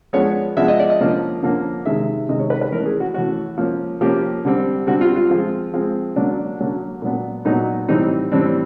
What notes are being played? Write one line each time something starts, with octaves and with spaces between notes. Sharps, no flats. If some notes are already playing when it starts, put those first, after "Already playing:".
F3 G#3 B3 D4 C#5
F3 G#3 B3 D4 E5
D#5
D5
D#5
D3 F3 A#3 C#4
D3 F3 A#3 C#4
C3 D#3 G#3 E5
C3 D#3 G#3 D#5
C#5
B4
B4
E3 A3 C#4 A#4
G#4
F#4
E3 A3 C#4 F#4
F3 A#3 C#4
F3 A#3 C#4 G4
D3 G3 C4
D3 G3 C4 F#4
F4
F4
F3 G#3 C4
F3 G#3 C4
D3 F#3 A#3 C#4 D4
D3 F#3 A#3 C#4
A#2 F#3 B3 D4
A#2 F#3 B3 D4 D#4
A2 E3 G3 C4 D#4
A2 E3 G3 C4 D4